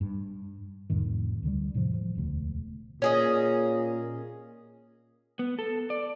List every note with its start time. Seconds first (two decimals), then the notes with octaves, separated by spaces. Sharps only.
0.01 G2
0.90 C2 F2 A2 D#3
1.43 D2 D3 G3
1.74 E1 A2 C3 F3
1.94 F3
2.15 E1 D2
3.02 A#2 C#4 G#4 D#5
5.39 B3
5.59 A4
5.90 D5